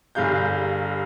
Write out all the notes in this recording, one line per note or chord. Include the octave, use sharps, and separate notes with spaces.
G1 G2 G#4 F5 G6